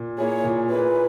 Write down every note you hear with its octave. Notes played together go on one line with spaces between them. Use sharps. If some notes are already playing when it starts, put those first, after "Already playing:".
Already playing: A#2
A#3 E4 G#4 C#5
A#2
A#3 E4 G#4 B4